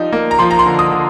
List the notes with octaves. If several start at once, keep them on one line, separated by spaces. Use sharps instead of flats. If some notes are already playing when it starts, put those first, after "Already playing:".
Already playing: F3 G3 D#4
A#3
A#5
F3 C6
A#5
C6
D3
D#6
D3